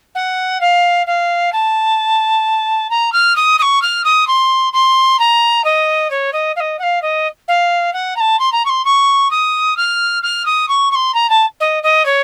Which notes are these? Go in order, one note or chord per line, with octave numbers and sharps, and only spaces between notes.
F#5
F5
F5
A5
A#5
F6
D#6
D#6
C#6
F6
D#6
C6
C6
A#5
D#5
C#5
D#5
F5
D#5
F#5
F5
D#5
F5
F#5
A#5
A5
C6
A#5
C#6
C6
C#6
D#6
F6
F6
D#6
C#6
C#6
C6
A#5
A5
D#5
D#5
C#5